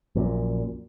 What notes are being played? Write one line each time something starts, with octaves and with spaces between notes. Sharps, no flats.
A#1 F#2 A#2